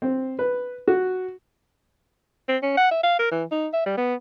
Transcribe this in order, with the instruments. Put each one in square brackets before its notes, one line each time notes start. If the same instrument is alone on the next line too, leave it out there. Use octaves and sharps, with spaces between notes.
[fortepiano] C4
B4
F#4
[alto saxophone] C4
C#4
F#5
E5
F5
A#4
E3
D#4
E5
G3
B3